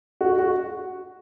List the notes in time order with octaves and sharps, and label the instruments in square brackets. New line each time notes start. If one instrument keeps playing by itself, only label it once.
[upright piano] F#4
F#4